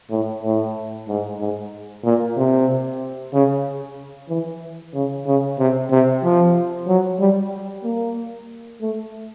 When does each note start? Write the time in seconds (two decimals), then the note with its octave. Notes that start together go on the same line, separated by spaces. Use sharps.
0.11 A2
0.43 A2
1.08 G#2
1.40 G#2
2.04 A#2
2.37 C3
3.34 C#3
4.29 E3
4.94 C#3
5.26 C#3
5.59 C3
5.91 C3
6.24 F3
6.87 F#3
7.20 G3
7.84 A#3
8.81 A3